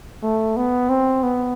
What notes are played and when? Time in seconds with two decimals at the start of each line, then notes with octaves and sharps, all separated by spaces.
0.22 A3
0.56 B3
0.89 C4
1.23 B3